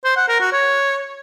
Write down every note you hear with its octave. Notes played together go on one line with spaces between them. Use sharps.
C5
F#5
A#4
F#4
C#5